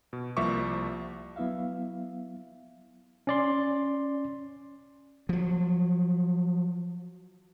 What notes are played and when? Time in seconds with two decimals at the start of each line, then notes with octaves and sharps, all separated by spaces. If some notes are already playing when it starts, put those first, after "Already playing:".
0.13 B2
0.37 C2 F3 A#3 E5 C#6 D6
1.36 F#3 B3 E4 E5 F5
3.27 C#4 D5 C6
5.29 F3 F#3